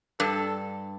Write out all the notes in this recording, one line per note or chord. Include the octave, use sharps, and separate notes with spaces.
G2 A4